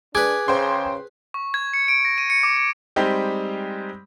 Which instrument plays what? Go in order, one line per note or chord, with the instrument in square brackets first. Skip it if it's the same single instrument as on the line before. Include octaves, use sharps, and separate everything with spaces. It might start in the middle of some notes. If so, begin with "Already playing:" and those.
[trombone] D4 [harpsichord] G#4 B4 [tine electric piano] G#5 D6 G#6
[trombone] C#3 [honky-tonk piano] C5 G5 C6
[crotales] C#6
G#6
C#7
D7
A#6
D#7
C#7
D6
C#7
[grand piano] G3 G#3 C4 D#4 G4